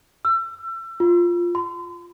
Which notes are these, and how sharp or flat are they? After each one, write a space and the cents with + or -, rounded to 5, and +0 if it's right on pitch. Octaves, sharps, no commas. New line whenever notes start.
E6 +30
F4 +0
C6 -40